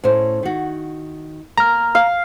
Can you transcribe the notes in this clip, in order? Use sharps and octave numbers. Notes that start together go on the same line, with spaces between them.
A2 C#4 C5
D#3 F#4
A#3 A#5 F6
F5